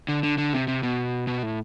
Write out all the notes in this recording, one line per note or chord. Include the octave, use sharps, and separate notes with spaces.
D3
D3
D3
C3
C3
B2
B2
A2